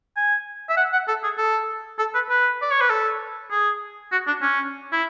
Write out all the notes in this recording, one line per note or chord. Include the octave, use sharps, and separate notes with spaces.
G#5
E5
F#5
F#5
A4
G#4
A4
A4
B4
B4
D5
C#5
B4
A4
G#4
F#4
D4
C#4
E4